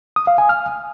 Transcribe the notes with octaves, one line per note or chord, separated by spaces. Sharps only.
D#6
F5
G#5
F6